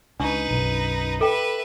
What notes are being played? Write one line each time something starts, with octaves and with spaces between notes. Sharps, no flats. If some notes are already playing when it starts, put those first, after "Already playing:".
C#2 D4 D#4 B4 C#6
B1 F#2 B2
A4 B4 E5 G5